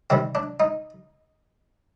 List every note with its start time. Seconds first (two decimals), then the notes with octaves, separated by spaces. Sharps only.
0.10 C3 D#3 G3 C4
0.35 D4
0.60 D#4